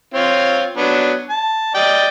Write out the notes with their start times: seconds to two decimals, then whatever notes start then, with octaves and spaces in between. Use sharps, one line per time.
0.14 C4 F4 C#5
0.77 F#3 B3 D4
1.30 A5
1.75 D5 D#5 G5